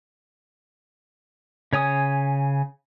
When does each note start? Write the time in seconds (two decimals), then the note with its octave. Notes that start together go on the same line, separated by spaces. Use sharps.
1.73 C#3 C#5 G#5 D#6